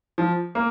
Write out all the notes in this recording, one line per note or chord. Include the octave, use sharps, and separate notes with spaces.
F3
A#3